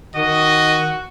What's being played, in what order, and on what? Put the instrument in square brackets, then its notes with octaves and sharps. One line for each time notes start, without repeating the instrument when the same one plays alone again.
[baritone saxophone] D#3 [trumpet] F#4 [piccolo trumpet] D#5